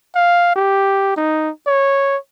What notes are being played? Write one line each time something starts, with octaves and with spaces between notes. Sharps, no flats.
F5
G4
D#4
C#5